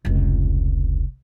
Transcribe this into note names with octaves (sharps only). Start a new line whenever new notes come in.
F1 C#2